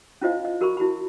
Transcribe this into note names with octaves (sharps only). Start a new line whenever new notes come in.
C#4 E4 F4 C5 D#5 F5
D#5
F#4 A#4 A#5 B5 C#6
E4 F#4 A#5 B5